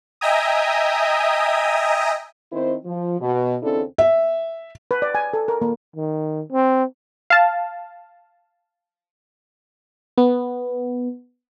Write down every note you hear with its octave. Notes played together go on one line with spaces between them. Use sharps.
D#5 E5 G5 G#5 A#5 D#6
D#3 C4 D#4 E4 C5
F3
B2
D#2 C#3 C4 D4 E4 A4
E5
B4
D5
G#5
A4
A#4
A#3
D#3
C4
F5 A5
B3